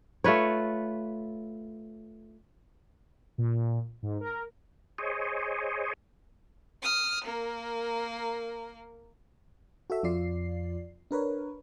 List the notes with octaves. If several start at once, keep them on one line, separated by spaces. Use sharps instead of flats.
A3 F4 B4 C#5
A#2
G#2
A#4
G#4 C5 C#5 D#5
D#6 F6
A#3 A#4
F#4 A4 E5
F2 F3 F4 D5 C7
D4 A#4 B4 C#5